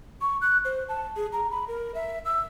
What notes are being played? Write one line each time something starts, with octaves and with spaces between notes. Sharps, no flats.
C#6
F#6
C5
A5
G#4
A#5
B5
A#4
E5
E6